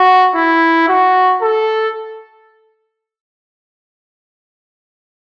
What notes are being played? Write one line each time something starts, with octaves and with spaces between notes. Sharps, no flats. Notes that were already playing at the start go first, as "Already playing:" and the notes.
Already playing: F#4
E4
F#4
A4